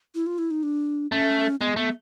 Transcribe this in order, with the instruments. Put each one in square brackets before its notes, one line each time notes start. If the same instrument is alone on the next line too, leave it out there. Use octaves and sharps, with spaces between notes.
[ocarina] E4
F4
E4
D#4
D4
[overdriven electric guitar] A3 [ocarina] C#4
[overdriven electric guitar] G#3 [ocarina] B3
[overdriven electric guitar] A3 [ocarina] B3